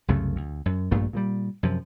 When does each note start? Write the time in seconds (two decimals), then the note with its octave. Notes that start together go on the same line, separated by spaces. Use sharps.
0.08 C2 F#2 C#3 A3
0.36 D2
0.66 F#2
0.91 A#1 G2 A#2 A3
1.13 A#2 E3 G3
1.63 F#2 C3 F3